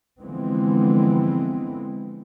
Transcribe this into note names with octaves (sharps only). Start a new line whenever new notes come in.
D3 E3 F3 G#3 B3 C4